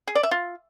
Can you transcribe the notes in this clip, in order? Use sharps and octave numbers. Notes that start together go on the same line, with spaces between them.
G#4
D5
E5
F4